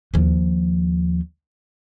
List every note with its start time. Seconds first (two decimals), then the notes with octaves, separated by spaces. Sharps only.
0.14 D#2 F3